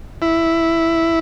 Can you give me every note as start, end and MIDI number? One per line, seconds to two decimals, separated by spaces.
0.22 1.19 64